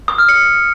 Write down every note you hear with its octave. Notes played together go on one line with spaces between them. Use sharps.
D#6
F6
C#7